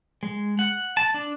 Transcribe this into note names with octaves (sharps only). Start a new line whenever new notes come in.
G#3
F#5
A5
D4